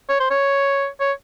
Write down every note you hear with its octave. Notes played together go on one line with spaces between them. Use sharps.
C#5
C5
C#5
C#5